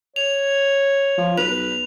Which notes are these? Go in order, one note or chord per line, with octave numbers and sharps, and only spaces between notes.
C#5 F7
F3
B1 B4 F7